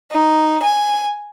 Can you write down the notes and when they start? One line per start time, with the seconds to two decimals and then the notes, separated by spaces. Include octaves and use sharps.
0.10 D#4
0.62 G#5